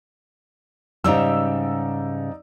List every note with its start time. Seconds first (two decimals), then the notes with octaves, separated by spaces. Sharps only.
1.04 G#2 C#3 G3 D#4 D5 E6